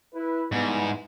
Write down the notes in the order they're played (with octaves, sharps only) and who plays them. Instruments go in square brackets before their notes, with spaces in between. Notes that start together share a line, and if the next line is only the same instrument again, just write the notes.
[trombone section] E4 B4
[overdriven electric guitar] G#2 [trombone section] E3 G3 B3